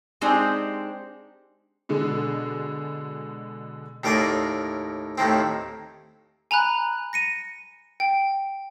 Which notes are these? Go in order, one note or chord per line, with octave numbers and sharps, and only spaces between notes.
G#3 C4 D4 D#4 G4 C5
B2 D3 G#3
D#2 A2 A#4 D5 D6 D#6
D#2 A2 D#3 C4
G#5 A#5 B5 F#6
A#6 C#7 D#7
G5